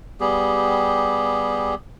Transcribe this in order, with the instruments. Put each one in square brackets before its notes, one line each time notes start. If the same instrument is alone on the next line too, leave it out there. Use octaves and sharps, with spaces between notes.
[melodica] G3 B3 G4 G#4